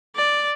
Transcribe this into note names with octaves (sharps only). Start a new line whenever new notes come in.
D5